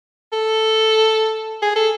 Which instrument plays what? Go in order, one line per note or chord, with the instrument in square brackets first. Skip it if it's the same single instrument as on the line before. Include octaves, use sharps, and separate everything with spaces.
[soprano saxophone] A4
G#4
A4